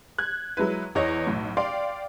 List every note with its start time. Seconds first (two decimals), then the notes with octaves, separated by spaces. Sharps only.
0.18 F#6 G#6
0.57 F#3 G#3 E4 B4
0.95 E2 E3 C#5 D#5 A#6
1.27 B1 A2
1.57 D5 F5 G5 C6